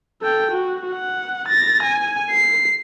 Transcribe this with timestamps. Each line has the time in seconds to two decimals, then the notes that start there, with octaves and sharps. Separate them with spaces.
0.22 A4 G5
0.52 F#4
0.93 F#5
1.49 A6 A#6
1.83 G#5
2.31 C7